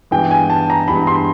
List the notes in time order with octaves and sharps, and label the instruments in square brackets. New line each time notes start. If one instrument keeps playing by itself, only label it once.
[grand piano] G2 E3 G#3 B3 G5
G#5
A5
A#5
G2 E3 G#3 B3 B5
C6